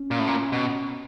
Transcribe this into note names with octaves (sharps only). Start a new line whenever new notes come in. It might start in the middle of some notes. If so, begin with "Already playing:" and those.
Already playing: C#4
A#2
A2
A#2
B2